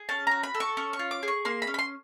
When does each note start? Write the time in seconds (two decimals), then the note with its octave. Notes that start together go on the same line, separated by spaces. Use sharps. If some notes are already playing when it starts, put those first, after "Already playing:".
Already playing: G#4
0.09 C#4 A5
0.27 F#4 A#5
0.43 B5
0.54 A4
0.60 C#6
0.77 C#4 C#6
0.93 C#6
0.99 F4
1.11 D6
1.23 G#4
1.28 C#6
1.45 A#3 C6
1.62 B5
1.67 C#4
1.74 B5
1.79 C6